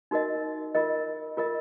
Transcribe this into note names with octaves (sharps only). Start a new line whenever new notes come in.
D#4 F#4 A#4 D#5
F4 A#4 D#5
F4 A#4 D#5